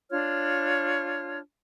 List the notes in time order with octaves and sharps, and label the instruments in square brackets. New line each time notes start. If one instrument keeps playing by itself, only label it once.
[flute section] D4 F4 C#5 F6